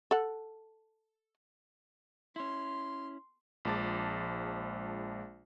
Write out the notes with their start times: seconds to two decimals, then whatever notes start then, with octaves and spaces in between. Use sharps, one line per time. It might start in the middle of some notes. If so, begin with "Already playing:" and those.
0.11 A4 F#5
2.36 C#4 E4 C6
3.65 A#1 F3 G#3 A5 D6 A6